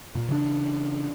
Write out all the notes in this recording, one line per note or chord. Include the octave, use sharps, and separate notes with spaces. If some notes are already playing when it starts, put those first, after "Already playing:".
A#2
C#3 E3 D4